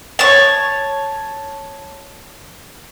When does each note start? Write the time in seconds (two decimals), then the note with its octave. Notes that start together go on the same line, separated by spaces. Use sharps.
0.19 C#5 A5